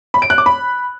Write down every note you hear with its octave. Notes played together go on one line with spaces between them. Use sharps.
B5
D7
F#6
D6
B5